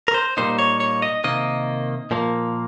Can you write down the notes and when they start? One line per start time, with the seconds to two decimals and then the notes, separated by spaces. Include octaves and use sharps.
0.08 A#4
0.14 C5
0.37 A#2 G3 A#3 D#4 C5
0.59 C#5
0.80 C#5
1.02 D#5
1.24 C3 D#3 A#3 D#5
2.11 A#2 F3 A#3